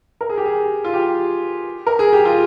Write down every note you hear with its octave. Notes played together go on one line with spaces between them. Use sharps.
A#4
G#4
G4
G#4
F4
G4
A#4
G#4
G4
F4